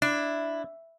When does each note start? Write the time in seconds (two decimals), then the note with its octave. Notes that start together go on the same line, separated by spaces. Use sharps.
0.02 D4 E4